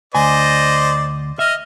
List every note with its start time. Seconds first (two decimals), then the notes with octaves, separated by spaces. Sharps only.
0.15 D2 C5 D5 D#5 G#5
1.39 D#5 E5 F6